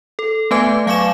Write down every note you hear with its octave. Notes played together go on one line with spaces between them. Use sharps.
A4
A3 B3 B4 G#5 D6 G#6
F#3 F5 G#5 C#6 D6 E7